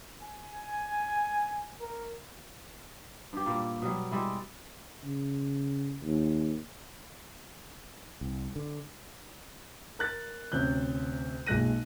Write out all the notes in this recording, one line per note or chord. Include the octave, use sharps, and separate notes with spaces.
G#5
A#4
G2 G4
A#2 G3 A#3
B2 F#3 G3
G3 G#3 E4
C#3
D#2
C2
D3
A#4 F#6 A6
D2 C3 C#4 F#6 G6
B1 A#2 G#3 F#6 A#6 D#7